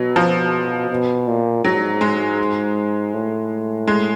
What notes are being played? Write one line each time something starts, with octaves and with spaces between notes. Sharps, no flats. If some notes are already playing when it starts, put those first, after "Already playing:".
Already playing: B2 F#3
F3
B2
A#2
G#2 F#3
G#3
A2
G#3